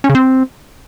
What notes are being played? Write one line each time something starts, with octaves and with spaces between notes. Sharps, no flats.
C#4
C#3
C4